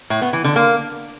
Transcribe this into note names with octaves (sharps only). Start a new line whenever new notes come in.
A2
B3
E3
D3
A#3